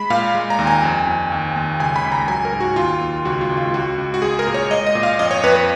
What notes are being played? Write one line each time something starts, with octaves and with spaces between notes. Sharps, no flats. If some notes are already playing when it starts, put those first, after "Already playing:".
Already playing: G#3 B5
A#2 F5
G#3
A#5
D#2
G#5
F2
F2
D#2
D#2
C#2 G#5
B5
C#2
A#5
F#3 G#5
A#4
G#2
F#4
D#2 F4
D#2
C#2 F#4
F4
C#2
F4
C#2 F#4
C#2
F#4
G#3 G#4
A#4
A#2
C#5
G#3 D#5
D#5
A#2
F5
F2 D#5
C#5
F2 B4
B4